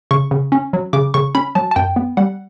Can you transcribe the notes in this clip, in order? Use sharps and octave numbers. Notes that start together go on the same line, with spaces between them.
C#3 C#6
C#3
C#4
F#3
C#3 D6
C#3 C#6
C#4 B5
F#3 A5
A5
F#2 G5
B3
G3 F#5